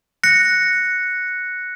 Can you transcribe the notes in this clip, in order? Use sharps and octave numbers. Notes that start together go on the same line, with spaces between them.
F#6 A#6 C#7